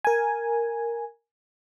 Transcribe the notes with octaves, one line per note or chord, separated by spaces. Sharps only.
A#4 G#5